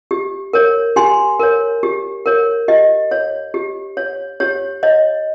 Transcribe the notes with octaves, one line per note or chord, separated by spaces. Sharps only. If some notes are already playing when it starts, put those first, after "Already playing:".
G4
A#4 C#5
G4 G#5 C6
A#4 C#5
G4
A#4 C#5
G4 D#5
C#5
G4
C#5
G4 C#5
C#5 D#5